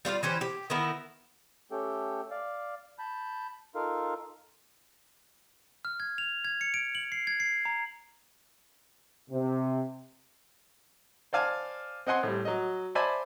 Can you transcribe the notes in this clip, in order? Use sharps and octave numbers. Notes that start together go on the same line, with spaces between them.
G3 F4 F#4 F5
E3 C#4 G4 C5
G4
D#3 B3 E4 A#4
A3 C#4 G4 A4 G5
D5 F5
A5 B5 G6
D#4 F4 A4 A#4 F5
F6
G#6
F7
G#6
C#7
D7
F#7
C7
G#6
C7
A#5
C3
C5 D5 F5 G#5 A5
C4 D#5 F#5 G#5 C6
A2 G3
F#3 D#5
C5 D5 E5 G#5 A5 B5